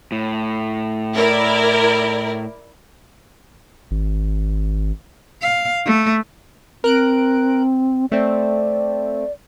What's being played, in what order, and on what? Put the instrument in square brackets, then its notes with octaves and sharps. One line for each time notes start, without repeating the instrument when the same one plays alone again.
[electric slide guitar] A2
[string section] E4 A#4 D5
[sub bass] G#1
[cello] F5
A3
[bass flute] C4 [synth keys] A#4 F#6 D7
[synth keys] A3 C4 [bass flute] D5